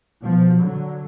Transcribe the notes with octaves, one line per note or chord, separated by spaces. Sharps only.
B2 F3
D3 F#3